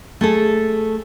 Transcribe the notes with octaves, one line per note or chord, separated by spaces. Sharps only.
A3 G#4 A4